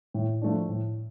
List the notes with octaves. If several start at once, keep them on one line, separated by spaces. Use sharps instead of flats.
A2
F3 A3 D4
A2